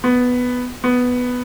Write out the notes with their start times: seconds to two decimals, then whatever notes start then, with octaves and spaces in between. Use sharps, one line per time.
0.04 B3
0.84 B3